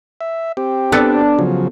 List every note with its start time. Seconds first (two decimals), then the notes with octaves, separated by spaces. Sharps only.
0.21 E5
0.57 C4 G4
0.92 B3 D4 A4
1.39 C#3 F3 F#3